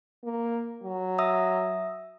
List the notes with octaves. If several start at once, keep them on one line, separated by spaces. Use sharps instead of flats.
A#3
F#3
E5 D#6 E6